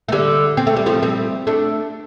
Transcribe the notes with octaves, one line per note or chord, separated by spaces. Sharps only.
A3
D3 G3
C4
A3
G3
F3 A3
G3 C4
A3 D4